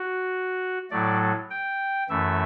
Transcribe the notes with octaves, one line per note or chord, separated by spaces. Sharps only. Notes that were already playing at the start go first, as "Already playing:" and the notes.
Already playing: F#4
A2 F#3 A3 D5
G5
F#2 E3 A3 E5